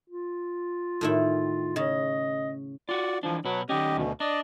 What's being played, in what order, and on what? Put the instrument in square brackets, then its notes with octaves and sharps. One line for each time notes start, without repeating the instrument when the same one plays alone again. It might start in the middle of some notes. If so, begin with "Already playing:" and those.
[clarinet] F4
[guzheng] A2 D#3 E4
[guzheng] C#3 [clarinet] D#5
[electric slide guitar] F4 F#4 [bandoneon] D5
[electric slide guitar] E3 D4 [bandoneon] F3
[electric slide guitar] B2 B4 [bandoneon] F#3
[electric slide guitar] D#3 C#4 [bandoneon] G4 D#5
[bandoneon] D2 B2
[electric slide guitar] D4 [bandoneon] D5 D#5